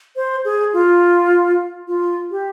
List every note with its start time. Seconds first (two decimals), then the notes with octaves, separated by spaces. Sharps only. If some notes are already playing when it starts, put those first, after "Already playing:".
0.16 C5
0.45 G#4
0.73 F4
1.88 F4
2.31 G4